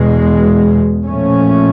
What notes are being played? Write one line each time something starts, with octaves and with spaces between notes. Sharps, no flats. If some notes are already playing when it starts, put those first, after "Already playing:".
Already playing: E2 B2 G#3
A#2 F3 A3 C#4